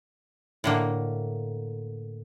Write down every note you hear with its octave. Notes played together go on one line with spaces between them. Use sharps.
A2 D3 A#3